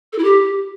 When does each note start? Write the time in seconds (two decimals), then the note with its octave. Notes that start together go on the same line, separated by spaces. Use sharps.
0.13 A4
0.18 E4
0.24 G4